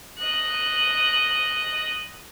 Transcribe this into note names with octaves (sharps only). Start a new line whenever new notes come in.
D#5 F#6